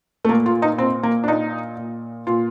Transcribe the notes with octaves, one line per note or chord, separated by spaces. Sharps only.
A3
A#2 A#3
F4
D#4
A#2 C4
A#3
D4
A#2 D#4
A#2
A#2 F4